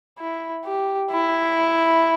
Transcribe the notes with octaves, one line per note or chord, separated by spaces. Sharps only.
E4
G4
E4